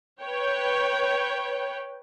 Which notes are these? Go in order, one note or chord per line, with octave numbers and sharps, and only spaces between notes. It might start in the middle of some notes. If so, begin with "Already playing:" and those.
B4 C#5 G5